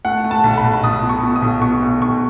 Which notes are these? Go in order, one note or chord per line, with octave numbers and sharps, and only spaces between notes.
A3 F#5
A3
A5
B1
B5
B1
B1 D#6
B2
C#6
B2
D#6
B1
B2 C#6
B1
B1 C#6